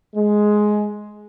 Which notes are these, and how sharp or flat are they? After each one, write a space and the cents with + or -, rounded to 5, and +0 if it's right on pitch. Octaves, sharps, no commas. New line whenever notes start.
G#3 +10